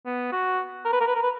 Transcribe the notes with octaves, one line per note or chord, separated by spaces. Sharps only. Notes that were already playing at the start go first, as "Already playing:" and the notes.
B3
F#4
A#4
B4
A#4
B4
A#4
B4